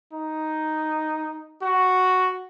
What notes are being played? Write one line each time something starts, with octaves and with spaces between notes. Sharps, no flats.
D#4
F#4